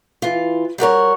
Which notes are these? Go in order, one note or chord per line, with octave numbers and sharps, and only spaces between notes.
E3 F4
G3 F#4 A#4 C#5